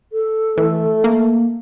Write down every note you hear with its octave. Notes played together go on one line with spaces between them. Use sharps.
A4
E3 A3
A#3